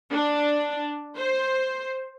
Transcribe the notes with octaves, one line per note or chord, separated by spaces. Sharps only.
D4
C5